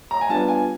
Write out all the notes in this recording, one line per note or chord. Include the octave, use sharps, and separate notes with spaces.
A#5
G#5
G3 B3 D4 F4 A5
G#5